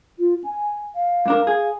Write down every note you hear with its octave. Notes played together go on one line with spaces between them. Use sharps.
F4
G#5
F5
G2 D4 A#4
G#4